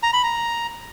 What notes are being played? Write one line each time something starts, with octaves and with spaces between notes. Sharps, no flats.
A#5
B5
A#5